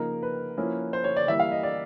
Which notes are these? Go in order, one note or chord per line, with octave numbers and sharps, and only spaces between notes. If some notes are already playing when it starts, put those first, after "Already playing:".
Already playing: C#3 F3 A#3 D#4 A#4
B4
F3 A#3 C#4 E4
C5
C#5
D5
E3 G3 A#3 E5
F5
D#5
D5